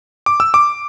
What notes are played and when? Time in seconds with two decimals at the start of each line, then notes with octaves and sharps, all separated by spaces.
0.26 D6
0.40 E6
0.54 D6